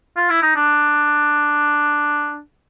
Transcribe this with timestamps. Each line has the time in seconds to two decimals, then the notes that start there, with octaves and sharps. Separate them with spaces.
0.17 F4
0.30 E4
0.43 D#4
0.56 D4